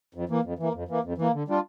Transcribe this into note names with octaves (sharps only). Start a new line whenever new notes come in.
F2
E3 A#3
F2
E3 A#3
F2
E3 A#3
F2
E3 A#3
D3
G3 D4 F4